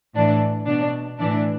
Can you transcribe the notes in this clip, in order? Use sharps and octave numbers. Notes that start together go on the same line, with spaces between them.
A2 E3 D4
B2 D4
A2 E3 D4